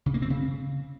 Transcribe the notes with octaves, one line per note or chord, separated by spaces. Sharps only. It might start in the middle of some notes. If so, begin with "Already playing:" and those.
C#3
A#3
C4
C#3